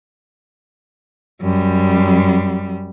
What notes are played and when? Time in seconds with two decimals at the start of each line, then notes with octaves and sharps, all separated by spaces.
1.42 F#2 G3